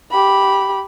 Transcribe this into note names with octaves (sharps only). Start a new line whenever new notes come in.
G4 B5